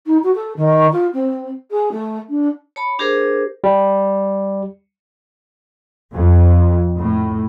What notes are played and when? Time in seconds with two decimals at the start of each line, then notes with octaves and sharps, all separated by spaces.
0.06 D#4
0.23 F#4
0.35 A4
0.56 D#3
0.92 F4
1.13 C4
1.70 G#4
1.91 A3
2.29 D4
2.76 C#5 A5 B5
2.99 D4 G4 G#4 A#4 C5
3.64 G3
6.14 F2
6.98 A2